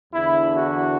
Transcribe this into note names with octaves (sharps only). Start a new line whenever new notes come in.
E2 D3 E4
F#4